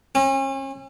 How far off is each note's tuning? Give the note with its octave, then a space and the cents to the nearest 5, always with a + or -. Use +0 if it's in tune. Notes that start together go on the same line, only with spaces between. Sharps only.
C#4 -40